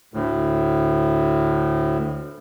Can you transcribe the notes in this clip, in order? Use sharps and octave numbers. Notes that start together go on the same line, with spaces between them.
D2 A2